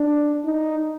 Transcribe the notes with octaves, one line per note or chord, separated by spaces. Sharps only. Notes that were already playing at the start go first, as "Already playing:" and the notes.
Already playing: D4
D#4